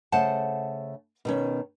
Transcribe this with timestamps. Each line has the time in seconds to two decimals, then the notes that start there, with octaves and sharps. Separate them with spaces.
0.12 C#3 A3 C5 F#5 A5
1.25 B2 D#3 C#4